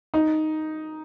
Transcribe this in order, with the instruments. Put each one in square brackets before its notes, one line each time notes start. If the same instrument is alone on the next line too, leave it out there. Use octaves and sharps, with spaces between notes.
[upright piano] D#4